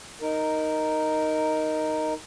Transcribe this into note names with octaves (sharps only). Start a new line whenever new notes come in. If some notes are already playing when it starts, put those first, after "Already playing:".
D#4 A#4